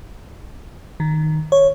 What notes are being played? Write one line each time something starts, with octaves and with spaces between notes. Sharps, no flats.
D#3
C#5